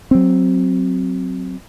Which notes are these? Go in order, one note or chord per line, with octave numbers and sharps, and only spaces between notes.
F#3 C4